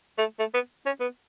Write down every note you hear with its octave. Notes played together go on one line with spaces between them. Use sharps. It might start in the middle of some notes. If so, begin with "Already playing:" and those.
A3
A3
B3
C#4
B3